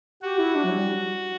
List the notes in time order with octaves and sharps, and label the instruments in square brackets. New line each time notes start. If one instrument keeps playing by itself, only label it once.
[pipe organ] F#4 [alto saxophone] G4
[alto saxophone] E4
D4
F#3
G3